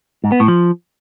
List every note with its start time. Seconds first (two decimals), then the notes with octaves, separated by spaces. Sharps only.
0.24 G#2
0.32 B3
0.40 A2
0.48 F3